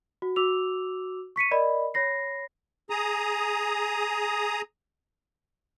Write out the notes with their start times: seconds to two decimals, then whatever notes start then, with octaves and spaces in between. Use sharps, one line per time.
0.22 F#4
0.36 F#4 D6 E6 F7
1.36 C#6 B6 C#7 D#7
1.51 A#4 D5 D#5 B5
1.94 C#5 B5 A#6 C7
2.90 G#4 A#5 D#6